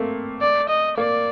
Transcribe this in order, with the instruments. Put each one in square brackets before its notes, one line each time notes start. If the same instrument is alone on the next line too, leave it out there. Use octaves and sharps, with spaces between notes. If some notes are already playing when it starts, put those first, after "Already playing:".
Already playing: [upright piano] A3 A#3 C4
[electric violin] D5
D#5
[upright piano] A#3 [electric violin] D5